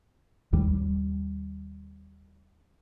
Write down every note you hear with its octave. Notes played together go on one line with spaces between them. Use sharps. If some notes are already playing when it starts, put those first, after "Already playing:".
D#2 G3